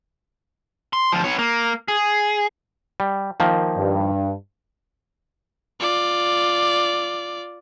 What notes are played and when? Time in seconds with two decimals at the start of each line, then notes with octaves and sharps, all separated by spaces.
0.93 C6
1.12 D2 F3
1.24 B3 C#5
1.39 A#3
1.88 G#4
3.00 G3
3.40 D#3 F3 A#3
3.78 G2
5.80 F4 D5